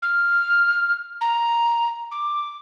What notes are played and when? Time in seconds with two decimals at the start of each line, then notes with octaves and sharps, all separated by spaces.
0.02 F6
1.21 A#5
2.11 D6